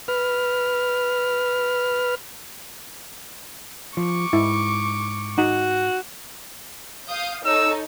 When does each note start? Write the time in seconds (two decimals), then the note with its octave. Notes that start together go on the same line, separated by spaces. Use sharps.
0.08 B4 F6
3.97 F3 C#6 D6
4.33 G#2 E4
5.38 D#4 F#4
7.08 F5 D#6 G6
7.46 D#4 A4 C#5 E6